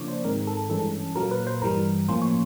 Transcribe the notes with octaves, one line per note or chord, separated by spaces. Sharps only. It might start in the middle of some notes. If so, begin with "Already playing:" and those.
Already playing: C#3 F3 A#3 D4 C#5 D5
C5
G#2 D#3 G#3 C4 A#4
A4
G2 E3 G#3 C#4 A4
A#2 F#3 A#3 A#4
B4
C5
G2 E3 G3 A#4
A2 F3 A#3 C#4 C5
C#5